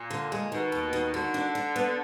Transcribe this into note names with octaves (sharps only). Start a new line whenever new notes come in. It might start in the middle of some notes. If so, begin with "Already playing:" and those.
Already playing: A#2
D3
G#3
B2 D#3
D#2
D#3
D3 F#4
D4
D4
B3